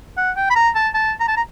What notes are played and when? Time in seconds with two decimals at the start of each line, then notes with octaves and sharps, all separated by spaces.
0.17 F#5
0.36 G5
0.50 B5
0.55 A#5
0.75 A5
0.94 A5
1.20 A#5
1.28 A5
1.37 A#5